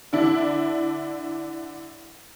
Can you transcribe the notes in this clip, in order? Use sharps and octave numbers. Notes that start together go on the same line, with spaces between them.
D3 D4 E4